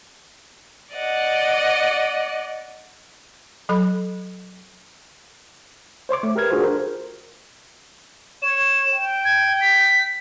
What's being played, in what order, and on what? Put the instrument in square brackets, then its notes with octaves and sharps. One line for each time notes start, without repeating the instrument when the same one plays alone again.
[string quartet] D5 D#5 F#5
[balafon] F#3 A4 B5
[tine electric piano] C5 C#5 C6 D6
A3
G4 A#4 B4 F6 G#6
D4 F4 F#4 G#4 A4 C5
A#4 C5
[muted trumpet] C#5 [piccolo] E7
[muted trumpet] G5
[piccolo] G#6
B6